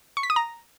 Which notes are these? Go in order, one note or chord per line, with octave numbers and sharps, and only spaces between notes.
C#6
B6
D#6
A#5